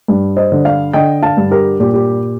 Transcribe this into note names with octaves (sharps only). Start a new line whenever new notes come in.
G2
C5 D#5
D3
D5 F5
D3 D#5 G5
F5 A5
G2
G4 A#4
A#2 G4
G4